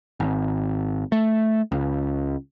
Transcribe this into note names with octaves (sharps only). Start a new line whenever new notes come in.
G#1
A3
C#2